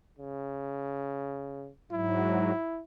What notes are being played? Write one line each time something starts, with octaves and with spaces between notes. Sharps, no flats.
C#3
G#2 F#3 E4